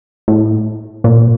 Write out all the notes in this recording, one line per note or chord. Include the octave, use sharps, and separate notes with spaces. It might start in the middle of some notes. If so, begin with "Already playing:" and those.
A2
A#2